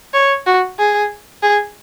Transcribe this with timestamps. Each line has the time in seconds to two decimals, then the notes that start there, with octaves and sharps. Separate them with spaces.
0.14 C#5
0.46 F#4
0.78 G#4
1.43 G#4